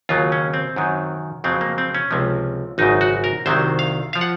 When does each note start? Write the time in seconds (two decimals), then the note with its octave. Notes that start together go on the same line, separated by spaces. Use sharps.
0.09 D#2 C#3 F#3 F4
0.32 C#4
0.54 C4
0.76 F#2 D#3 F#3
1.44 F2 C#3 F#3 C4
1.61 A#3
1.78 C4
1.95 C#4
2.11 C#2 C3 F3
2.78 G#1 F#2 C#3 D#4
3.01 F#4
3.24 A#4
3.46 C2 C3 D#3 F#3 C5
3.79 F5
4.13 F3 F5
4.21 F#5